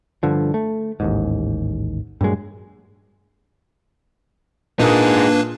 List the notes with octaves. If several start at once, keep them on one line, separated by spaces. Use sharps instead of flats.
G2 D3 F3
A3
A1 D#2 G#2
G2 A#2 F#3 G#3
A#2 A#3 D4 D#4 G#4 A#4 B4 D#6